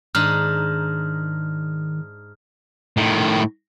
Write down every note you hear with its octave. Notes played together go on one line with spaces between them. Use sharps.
G#2 D#3 D4 D#4 F6
A2 D#3